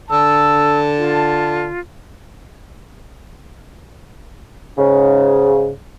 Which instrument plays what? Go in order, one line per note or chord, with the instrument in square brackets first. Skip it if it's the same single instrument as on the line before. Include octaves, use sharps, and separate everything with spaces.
[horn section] D3 A5 [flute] E6
[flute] F4
[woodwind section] G#2 C#3